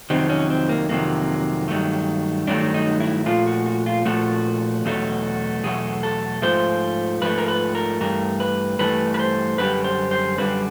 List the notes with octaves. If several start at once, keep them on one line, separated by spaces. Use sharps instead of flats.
F2 C3 D#3 F#3 C4
C#4
C4
A#3
F2 C3 D#3 F#3 A#3
G2 D#3 F#3 A3
G2 D#3 F#3 A3 D4
D#4
E4
A#2 F3 A3 F4
F#4
F#4
F4
A#2 F3 A3 F#4
E2 B2 F#3 A3
E2 B2 F#3 A3 G#4
A4
G#2 F3 A3 C5
G#2 F3 A3 B4
A#4
B4
A#4
G2 E3 A3 A#4
B4
G2 E3 A3 B4
B4
C5
F#2 D3 G3 B4
C5
C5
F#2 D3 G3 B4